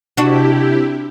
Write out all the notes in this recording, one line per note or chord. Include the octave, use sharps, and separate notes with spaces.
C3 D4 E4 F#4 G4